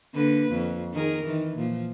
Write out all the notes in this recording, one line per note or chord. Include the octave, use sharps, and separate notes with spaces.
D3 A#3 B4
F2
D#3 G#4 A#4
D#3 E3
A#2 F3